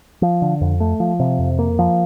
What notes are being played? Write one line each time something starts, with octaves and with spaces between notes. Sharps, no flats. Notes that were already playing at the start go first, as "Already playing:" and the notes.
F3
D3
F2
A3
F3
C3
F2
A#3
F3